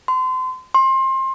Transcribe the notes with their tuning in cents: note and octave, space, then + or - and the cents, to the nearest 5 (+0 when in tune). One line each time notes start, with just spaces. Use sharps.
C6 -30
C6 +25